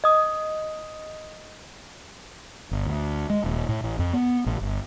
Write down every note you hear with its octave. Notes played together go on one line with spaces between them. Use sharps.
D#5 D#6
G1
D2
G#3
D#1
A2
A1
F2
B3
A1
G1